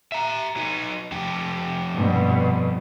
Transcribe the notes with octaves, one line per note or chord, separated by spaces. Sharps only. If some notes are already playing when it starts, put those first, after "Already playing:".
E5 A#5
F#3 D#4
F2 G4
G2 B2